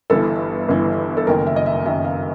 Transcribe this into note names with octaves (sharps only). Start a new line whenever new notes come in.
G1 G2 E3 A4
G1 G2 E3
A4
F#1 F#2 D#3 A#4
E5
D#5
E5
F#1 F#2 D#3 E5
F5